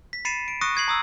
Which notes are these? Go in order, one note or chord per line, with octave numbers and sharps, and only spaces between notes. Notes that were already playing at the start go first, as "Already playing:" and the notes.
B6
B5 A6 C7 C#7 D#7 E7
D7
C#6 D#6 F#6 A#6 C#7 D#7
D#6 G#6 C7 F#7
A#5 D#6 E6